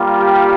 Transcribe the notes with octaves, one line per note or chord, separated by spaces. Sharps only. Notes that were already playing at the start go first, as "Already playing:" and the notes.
Already playing: G3 A#3 F4
G4